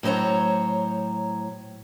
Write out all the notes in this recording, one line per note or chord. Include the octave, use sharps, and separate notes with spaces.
A2 F#3 C5 C#5 A#5